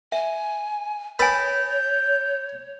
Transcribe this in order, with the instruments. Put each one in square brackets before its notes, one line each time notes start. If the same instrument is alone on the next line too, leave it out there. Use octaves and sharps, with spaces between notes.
[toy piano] E5 [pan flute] G#5
[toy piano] B4 G#5 [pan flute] C#5 [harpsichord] D#5 A5 B5 [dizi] G6